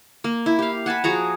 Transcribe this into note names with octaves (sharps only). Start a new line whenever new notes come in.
A#3
E4
G4 F5
F#5 G#5 A5 B5
F3 F#4 G#4 A#5